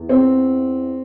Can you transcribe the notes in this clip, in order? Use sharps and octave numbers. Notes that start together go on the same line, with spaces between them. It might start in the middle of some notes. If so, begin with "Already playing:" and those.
Already playing: E2 E3
C4